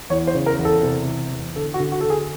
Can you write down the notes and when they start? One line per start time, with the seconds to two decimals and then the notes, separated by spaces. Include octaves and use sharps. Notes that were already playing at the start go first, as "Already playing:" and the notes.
0.10 E2 C#5
0.27 C5
0.35 C#3
0.46 A#4
0.59 E2
0.65 A4
0.83 C3
1.08 E3
1.31 E2
1.56 D3 A4
1.74 F#4
1.80 D3
1.92 F#4
2.01 A4
2.05 D3
2.10 G#4